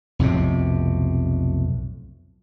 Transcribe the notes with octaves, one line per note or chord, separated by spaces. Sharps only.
B1 F2 A2 C3